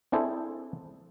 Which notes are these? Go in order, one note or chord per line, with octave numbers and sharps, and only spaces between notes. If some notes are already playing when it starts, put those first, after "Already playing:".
C4 D4 E4 G#4 A4 C5